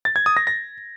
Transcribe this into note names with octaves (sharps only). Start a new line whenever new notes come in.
A6
G#6
D#6
A#6
A#6